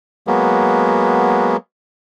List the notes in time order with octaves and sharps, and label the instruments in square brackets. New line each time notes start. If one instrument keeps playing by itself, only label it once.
[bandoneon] F#3 G#3 A#3 B3